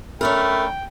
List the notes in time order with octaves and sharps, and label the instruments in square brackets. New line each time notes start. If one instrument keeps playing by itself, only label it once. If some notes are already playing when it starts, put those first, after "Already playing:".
[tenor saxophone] A3 [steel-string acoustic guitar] C#4 D4 A#4 [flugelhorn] G5 [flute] B5